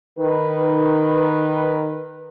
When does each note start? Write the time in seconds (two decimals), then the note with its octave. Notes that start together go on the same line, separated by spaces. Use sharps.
0.19 D#3 B4